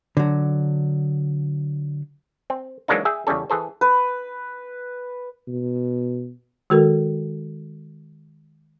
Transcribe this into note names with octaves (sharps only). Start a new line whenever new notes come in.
D3 F#3
C4
E3 F#3 G#3 A#3 D4 D#4
G#4 E5 G5
E2 C#3 G3 C#4 A4
E3 G#4 A4 C5
B4
B2
D#3 G#3 F#4 A4 A#4